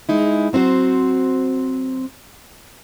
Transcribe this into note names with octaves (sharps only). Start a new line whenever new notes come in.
G#3 D#4 E4
F#3 C4 E4 F#4 C5